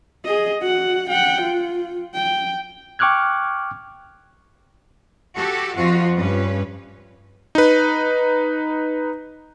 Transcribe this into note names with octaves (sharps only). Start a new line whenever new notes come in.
G#4 D#5
F#4 F#5
F#5 G5
F4
G5
G5 C#6 D6 F6 F#6 G#6
F#4 G4 A4
F2 F3 F4 F#4
G2 C#4 B4
D#4 B4